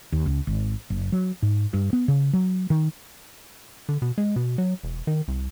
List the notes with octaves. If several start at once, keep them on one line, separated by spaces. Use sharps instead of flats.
D#2
C#2
G#1
F#1
F#3
G#2
G2
B3
C#3
F#3
D#3
D3
B2
G#3
B2
F#3
E1
D#3
C2